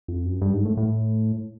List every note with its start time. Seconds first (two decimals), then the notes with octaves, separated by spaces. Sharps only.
0.08 F2
0.25 F#2
0.42 G2
0.53 G#2
0.65 A2
0.77 A2